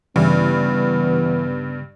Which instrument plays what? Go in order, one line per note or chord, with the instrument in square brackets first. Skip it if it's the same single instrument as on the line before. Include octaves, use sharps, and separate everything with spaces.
[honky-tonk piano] G2 [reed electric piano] C#3 G3 [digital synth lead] E3 [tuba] B3